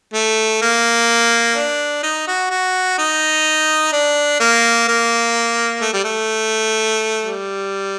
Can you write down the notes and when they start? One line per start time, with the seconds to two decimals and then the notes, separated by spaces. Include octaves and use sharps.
0.14 A3
0.62 A#3
1.56 D4
2.03 D#4
2.28 F#4
2.50 F#4
2.98 D#4
3.93 D4
4.40 A#3
4.88 A#3
5.82 A3
5.94 G3
6.04 A3
7.24 G3